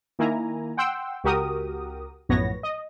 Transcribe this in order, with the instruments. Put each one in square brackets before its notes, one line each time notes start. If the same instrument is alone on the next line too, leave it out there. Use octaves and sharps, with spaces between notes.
[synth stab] D#3 A#3 E4 G#5 A#5
F#5 G5 C6 E6
C#2 F#4 G4 A#4 D#6
A#1 F#2 A2 B3 C#5 A#6
D#5